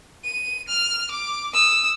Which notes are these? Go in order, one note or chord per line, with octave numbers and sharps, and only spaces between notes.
D#7
F6
D6
D#6 E6